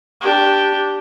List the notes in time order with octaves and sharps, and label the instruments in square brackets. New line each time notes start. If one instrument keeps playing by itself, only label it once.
[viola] D4 G4